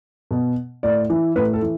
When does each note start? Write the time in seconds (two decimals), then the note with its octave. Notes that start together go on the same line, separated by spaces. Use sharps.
0.31 B2
0.83 A2 D5
1.10 E3
1.36 A2 B4
1.53 A4
1.62 E3